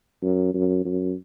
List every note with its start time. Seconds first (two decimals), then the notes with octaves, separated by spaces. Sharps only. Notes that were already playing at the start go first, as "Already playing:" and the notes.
0.22 F#2
0.54 F#2
0.85 F#2